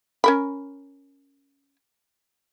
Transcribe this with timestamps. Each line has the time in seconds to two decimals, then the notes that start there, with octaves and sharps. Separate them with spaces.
0.24 C#4 A#4 B5